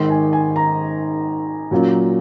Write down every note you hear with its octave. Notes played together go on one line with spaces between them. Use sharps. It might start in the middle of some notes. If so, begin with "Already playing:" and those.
Already playing: G#1 G#2 D#3 C6
G#5
G#5
A#5
A#2 F#3 C#4 F4